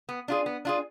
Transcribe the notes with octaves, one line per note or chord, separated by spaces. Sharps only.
B3
D4 F4 G#4
B3
D4 F4 G#4